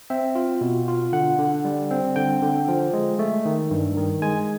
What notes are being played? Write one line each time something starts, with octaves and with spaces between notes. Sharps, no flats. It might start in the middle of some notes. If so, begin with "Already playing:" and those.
C4 E5
F4
B2
F4
D3 F#5
D3
G3
C4
D3 G5
D3
F3
G#3
A3
D#3
G2
D#3
G#3 G#5